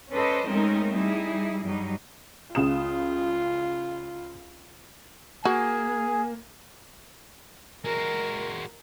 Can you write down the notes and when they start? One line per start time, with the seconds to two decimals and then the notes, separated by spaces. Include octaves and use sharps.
0.11 C#4 A4 B4 C5 D5 D#5
0.48 G#3 A3 C4 C#4 D#4 A#4
0.94 G3 D#4 E4 G#4
1.65 G2 F#3 G3 D#4
2.55 C#2 F4 D#6 E7
5.45 A#3 F#4 G#4 G#5
7.85 G#3 F#4 A#4